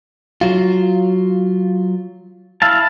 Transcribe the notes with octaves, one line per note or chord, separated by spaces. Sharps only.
F#3 F4
E4 F5 A5